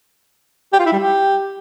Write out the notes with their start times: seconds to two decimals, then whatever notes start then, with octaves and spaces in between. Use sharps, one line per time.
0.73 G4
0.80 F4
0.86 E4
0.93 G3
0.99 G4